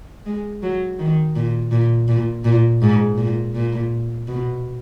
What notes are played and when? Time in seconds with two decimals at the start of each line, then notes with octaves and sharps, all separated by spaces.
0.26 G#3
0.63 F#3
0.99 D#3
1.36 A#2
1.72 A#2
2.08 A#2
2.44 A#2
2.82 G#2
3.17 A#2
3.55 A#2
4.27 B2